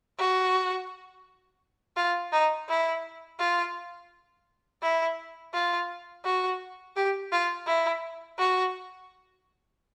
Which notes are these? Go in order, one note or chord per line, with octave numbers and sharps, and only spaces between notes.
F#4
F4
D#4
E4
F4
E4
F4
F#4
G4
F4
E4
F#4